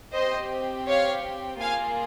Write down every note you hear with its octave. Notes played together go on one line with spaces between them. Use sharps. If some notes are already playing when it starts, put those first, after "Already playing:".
C4 G4 C5 D#5
C#5 F5
A#3 F4 G#4 F5 G#5